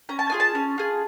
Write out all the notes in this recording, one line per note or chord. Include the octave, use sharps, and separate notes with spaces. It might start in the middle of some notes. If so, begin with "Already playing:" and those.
C#4 A#5
A5
F4 G#4 G#5
A5
C#4
F4 G#4